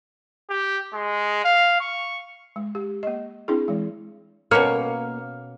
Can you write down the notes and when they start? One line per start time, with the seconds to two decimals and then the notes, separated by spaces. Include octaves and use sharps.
0.50 G4
0.93 G#3
1.44 F5
1.81 C#6
2.56 G#3
2.75 G4
3.03 A#3 D#5
3.48 C4 D4 E4 G#4
3.68 E3 G#3
4.51 B2 A#3 C#4 C#5 F6